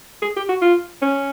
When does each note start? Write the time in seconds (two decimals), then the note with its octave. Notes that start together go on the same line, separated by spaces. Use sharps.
0.22 G#4
0.36 G4
0.49 F#4
0.62 F4
1.02 C#4